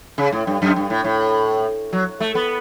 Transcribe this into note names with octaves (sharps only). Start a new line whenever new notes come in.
C#3
A2
G2
F#2
G2
A2
A2
F#3
A3
B3